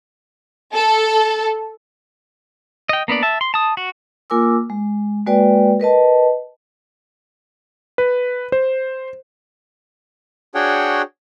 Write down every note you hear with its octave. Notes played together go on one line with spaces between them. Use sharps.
A4
D#5 G5
A#3 B3 D4 D5
E5 A5
C6
A5 D#6
F#4
A#3 F4 A#4 G#5 D6 E6
G#3
G#3 A#3 F#4 B4 D5 G5
A#4 B4 D#5 A5
B4
C5
D4 F#4 G#4 C#5 F#5 G5